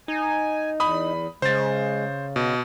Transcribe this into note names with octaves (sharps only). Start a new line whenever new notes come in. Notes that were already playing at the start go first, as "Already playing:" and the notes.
D#4 G#5
E2 B5 D#6
C#3 G#3 C5 A6
B2 D#5